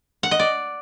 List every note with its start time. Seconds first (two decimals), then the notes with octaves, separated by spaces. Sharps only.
0.23 F#5
0.31 D#5
0.39 D5